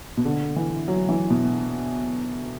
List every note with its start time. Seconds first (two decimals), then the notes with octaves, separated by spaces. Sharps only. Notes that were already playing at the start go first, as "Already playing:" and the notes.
0.17 B2
0.25 D3
0.56 E3
0.88 F#3
1.09 E3
1.30 B2